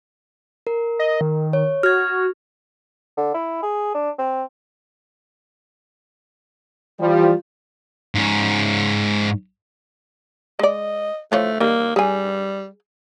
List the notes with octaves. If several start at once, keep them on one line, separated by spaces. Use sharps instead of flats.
A#4
D#5
D#3
C#5
F#4 F6 G#6
D3
E4
G#4
D4
C4
E3 F3 G3 F4
G#2 C#4
G#3 D5 D#5
E3 F3 A3 C#5
D#3 G3 A#3
G3 G#4 G#5